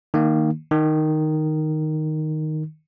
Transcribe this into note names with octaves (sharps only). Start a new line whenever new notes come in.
D#3 A#3
D#3